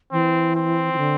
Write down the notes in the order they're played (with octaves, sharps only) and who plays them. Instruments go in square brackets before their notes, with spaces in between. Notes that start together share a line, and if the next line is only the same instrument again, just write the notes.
[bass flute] E3 [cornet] C4
[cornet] C4
[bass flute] E3
D3